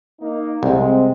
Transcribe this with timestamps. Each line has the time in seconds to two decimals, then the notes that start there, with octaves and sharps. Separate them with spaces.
0.21 A#3 D#4
0.63 C2 G#3 C4